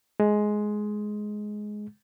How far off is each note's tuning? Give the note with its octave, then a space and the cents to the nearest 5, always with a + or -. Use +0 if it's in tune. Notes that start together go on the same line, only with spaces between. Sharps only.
G#3 +10